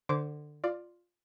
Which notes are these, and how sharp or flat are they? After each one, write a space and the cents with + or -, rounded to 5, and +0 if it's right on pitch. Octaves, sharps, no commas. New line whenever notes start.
D3 +20 C5 -5 D6 -20
F4 +5 D5 +15